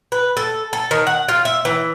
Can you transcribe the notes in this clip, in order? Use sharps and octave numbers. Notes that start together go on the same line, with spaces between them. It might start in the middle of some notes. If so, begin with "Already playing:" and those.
B4
A4
A4
D#3
F#5
F4
E5
E3